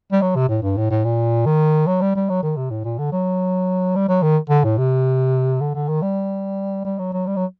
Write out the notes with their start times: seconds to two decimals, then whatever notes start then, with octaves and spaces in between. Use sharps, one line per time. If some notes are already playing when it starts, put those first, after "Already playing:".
0.12 G3
0.22 F#3
0.36 C3
0.49 A2
0.63 G2
0.77 A2
0.90 A2
1.05 A#2
1.46 D#3
1.87 F#3
2.01 G3
2.16 G3
2.29 F#3
2.43 D#3
2.57 C3
2.71 A2
2.85 A#2
2.99 D3
3.12 F#3
3.96 G3
4.09 F#3
4.23 D#3
4.50 D3
4.64 A2
4.78 C3
5.61 D3
5.75 D3
5.89 D#3
6.02 G3
6.85 G3
6.99 F#3
7.13 F#3
7.27 G3
7.36 F#3